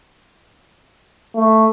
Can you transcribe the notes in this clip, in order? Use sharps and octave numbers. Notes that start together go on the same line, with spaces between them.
A3